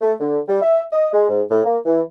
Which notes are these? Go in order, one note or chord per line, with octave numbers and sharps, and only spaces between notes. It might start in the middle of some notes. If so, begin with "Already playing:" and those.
A3
D3
G3
E5
D#5
G#3
G#2
A2
A#3
E3